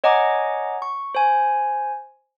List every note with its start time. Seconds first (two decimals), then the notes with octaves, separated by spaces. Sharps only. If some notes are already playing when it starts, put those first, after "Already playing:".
0.04 C#5 D#5 F#5 G#5 A#5 D6
0.82 C#6
1.15 C5 G#5